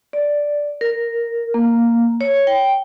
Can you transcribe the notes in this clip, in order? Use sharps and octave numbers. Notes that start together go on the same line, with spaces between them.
D5
A#4
A#3
C#5
G5